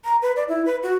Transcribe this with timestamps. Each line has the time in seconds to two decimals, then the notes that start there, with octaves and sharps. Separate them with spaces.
0.05 A#5
0.22 B4
0.36 D5
0.49 E4
0.65 B4
0.83 F#4